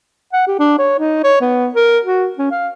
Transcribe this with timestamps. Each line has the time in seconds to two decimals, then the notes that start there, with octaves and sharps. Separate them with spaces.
0.33 F#5
0.47 G4
0.59 D4
0.79 C#5
0.99 D#4
1.24 C#5
1.41 B3
1.75 A#4
2.04 F#4
2.38 C#4
2.51 F5